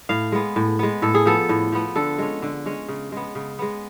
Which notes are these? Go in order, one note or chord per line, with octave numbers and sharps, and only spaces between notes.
A2 F5
G#3 B3
A2
G#3 B3
A2 A4
G#4
F3 B3 A4
A2
F3 B3
D3 A4
G#3 C#4
D3
G#3 C#4
C#3
G#3 B3
C#3
G#3 B3